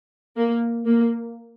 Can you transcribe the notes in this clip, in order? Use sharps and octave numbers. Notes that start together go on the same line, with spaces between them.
A#3
A#3